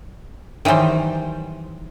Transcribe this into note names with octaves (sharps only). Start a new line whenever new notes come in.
D#3 E3 F#3 G3 C5